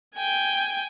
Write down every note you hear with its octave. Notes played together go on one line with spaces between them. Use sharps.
G5 G#5